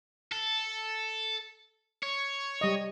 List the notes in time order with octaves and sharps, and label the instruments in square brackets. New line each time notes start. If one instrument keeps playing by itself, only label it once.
[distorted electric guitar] A4
C#5
[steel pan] G3 D#5